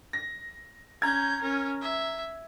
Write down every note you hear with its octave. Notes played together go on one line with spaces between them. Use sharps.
A#6
C#4 A#5 G6 G#6
C#4 A#4
E5